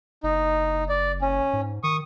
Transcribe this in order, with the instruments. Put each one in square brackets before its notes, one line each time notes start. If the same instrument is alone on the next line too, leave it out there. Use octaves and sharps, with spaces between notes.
[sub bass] F#1 [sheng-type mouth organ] D#4
[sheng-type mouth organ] D5
C#4
[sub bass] G#2
[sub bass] D#3 [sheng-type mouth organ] C#6 D#6